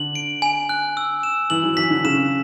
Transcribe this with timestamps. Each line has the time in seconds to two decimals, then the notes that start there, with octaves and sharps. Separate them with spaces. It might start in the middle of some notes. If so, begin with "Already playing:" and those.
Already playing: D3 F#7
0.15 D7
0.42 G#5
0.69 F#6
0.97 E6
1.23 E7
1.50 E3 F#7
1.64 F#3
1.77 E3 B6
1.90 D3
2.04 C#3 E7